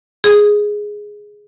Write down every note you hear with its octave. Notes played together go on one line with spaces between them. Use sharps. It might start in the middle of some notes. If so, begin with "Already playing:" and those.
G#4